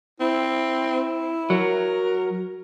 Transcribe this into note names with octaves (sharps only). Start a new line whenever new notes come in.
C4 E4
F#3 A#4